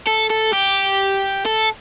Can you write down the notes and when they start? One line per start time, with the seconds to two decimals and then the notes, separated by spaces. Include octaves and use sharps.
0.07 A4
0.30 A4
0.52 G4
1.45 A4